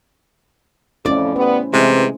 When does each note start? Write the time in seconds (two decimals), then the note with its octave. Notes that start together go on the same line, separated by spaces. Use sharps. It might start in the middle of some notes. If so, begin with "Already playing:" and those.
1.06 F2 A3 C#4 E4 D5
1.36 G3 B3 C5
1.74 C3 E3 G#3